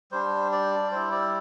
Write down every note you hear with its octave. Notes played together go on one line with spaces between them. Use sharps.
G3 D4 C5
D5
G3 E4 C5
D5